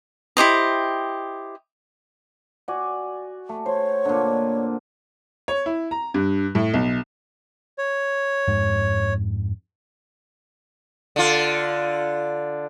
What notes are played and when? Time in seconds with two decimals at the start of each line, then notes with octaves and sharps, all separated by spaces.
0.37 E4 G4 C5 D#5
2.68 F#4 D5 G#5
3.49 A3
3.66 C5 C#5
4.05 A#2 D3
5.48 C#5
5.66 E4
5.91 A#5
6.14 G2
6.55 A2
6.74 B1
7.78 C#5
8.48 F2 G#2 G#3
11.16 D3 F4